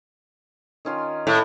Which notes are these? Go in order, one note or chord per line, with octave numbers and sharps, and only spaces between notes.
D#3 C#4 F4
A2